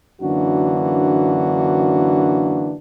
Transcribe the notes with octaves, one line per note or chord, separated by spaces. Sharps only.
F#2 D3 E3 A#3 D4 F#4